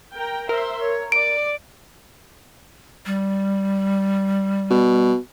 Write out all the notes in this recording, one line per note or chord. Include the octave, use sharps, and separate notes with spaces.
A#4 G5 A#5
A#4 C5 E5 C6
C#5
D5 D7
G3
B2